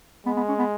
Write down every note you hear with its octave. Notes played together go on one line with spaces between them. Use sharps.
G#3 B3
B3
C#4
B3